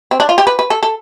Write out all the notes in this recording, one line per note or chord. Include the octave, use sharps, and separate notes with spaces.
C4
D4
F4
G4
B4
B4
A4
A4